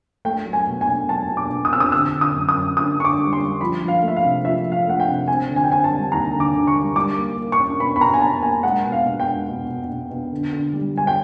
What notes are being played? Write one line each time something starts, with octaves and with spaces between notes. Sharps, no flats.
A3 G5
F#3
G#5
B2
G#5
B2
F#3 A5
B2
D6
B2
D#6
C4 E6
D#6
D3 E6
D3
D#6
F#2
D#6
F#2
D3 D#6
D3 C#6
D6
G3
C6
G3
F3 B5
F3
F5
A3
E5
F5
C3
F3 E5
F3
F5
A3 F#5
G5
C3
C4 G#5
D3
G#5
G5
C4 G#5
A5
G3
D#2 A#5
D3
D6
D3
C#6
G3
G3 D6
A#3
A#3
C#6
C#4
B2 B5
B5
B2 A#5
G#5
B2 A5
A#3 G#5
G#3 F#5
B2
F5
B2
G5
G#3
B2
B2
B2
B2
D3
D3
G3
G3 G#5
G5